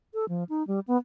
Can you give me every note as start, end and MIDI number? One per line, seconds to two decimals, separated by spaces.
0.14 0.25 69
0.29 0.44 53
0.49 0.66 63
0.67 0.80 55
0.88 0.97 59